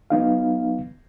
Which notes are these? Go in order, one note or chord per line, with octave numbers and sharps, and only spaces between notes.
F#3 B3 D#4 F5